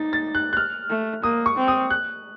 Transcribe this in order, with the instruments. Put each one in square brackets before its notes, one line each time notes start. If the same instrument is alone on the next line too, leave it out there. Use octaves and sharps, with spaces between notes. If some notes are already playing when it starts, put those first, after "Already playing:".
Already playing: [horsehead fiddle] D#4 [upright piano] A6
[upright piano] A6
F#6
F#6
F6
[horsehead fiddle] A3
[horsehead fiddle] A#3 [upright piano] D#6
[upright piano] C#6
[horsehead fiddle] C4
[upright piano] D#6
F#6